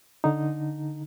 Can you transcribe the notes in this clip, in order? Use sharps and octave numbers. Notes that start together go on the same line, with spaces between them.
D3 D#4